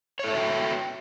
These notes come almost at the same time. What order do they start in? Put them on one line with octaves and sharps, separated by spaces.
C#5 A4 E5 F#4 G5